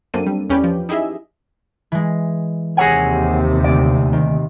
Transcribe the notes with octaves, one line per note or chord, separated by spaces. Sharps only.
F#2 A#3 C4 D4 A4 D#7
G3
E2 C#4 G4 B4 D5 G5
F3
D#4 E4 G4 G#4 D#5 E5
E3 G#3
D#2 C3 G#4 C#5 F#5 G#5 E6 A#6
D2 D5
D#3